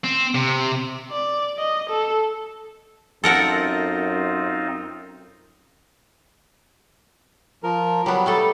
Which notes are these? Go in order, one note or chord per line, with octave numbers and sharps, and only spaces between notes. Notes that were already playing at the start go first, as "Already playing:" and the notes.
C4
C3
D5
D#5
A4
F#2 C4 D#4 F4 A4 A#4 F#5
F3 A#4
F#3 G3 B3
G3 A3 A4